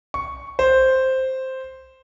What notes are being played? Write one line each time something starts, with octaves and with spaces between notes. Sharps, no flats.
C#6
C5